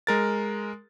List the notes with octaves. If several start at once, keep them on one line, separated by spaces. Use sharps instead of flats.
G#3 A#4 A6